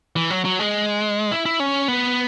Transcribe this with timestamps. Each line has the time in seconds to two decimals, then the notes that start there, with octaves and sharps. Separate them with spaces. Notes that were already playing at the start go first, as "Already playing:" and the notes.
0.16 E3
0.30 F#3
0.45 F#3
0.59 G#3
1.31 E4
1.46 E4
1.60 C#4
1.88 B3